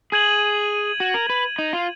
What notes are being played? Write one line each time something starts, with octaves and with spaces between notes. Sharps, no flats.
G#4 G#6 D#7 F#7
F#4
A#4
B4
D#4
F4